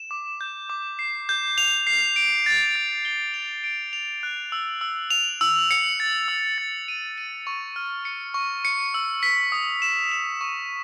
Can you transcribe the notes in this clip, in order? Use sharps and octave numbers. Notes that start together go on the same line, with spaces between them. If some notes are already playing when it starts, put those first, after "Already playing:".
Already playing: E7
D6
G6
D6
C7
G6
F7
C7
D7
A6
A6
G7
F7
D7
F7
F#6
E6
E6
F7
E6
C#7
A6
E6
A6
D#7
D#7
C#6
F6
C#7
C#6
C#7
E6
B6
D#6
E7
E7
C#6